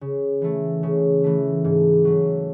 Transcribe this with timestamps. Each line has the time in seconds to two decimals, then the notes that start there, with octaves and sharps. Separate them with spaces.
0.01 C#3
0.41 E3 A3
0.83 C#3
1.24 E3 A3
1.64 G#2
2.05 F#3 A3